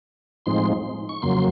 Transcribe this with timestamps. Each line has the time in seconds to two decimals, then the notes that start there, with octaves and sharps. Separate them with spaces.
0.46 A2 F3 G#3 C4 D#4 C6
1.09 C#6
1.22 F2 C#3 F#3 A#3 C6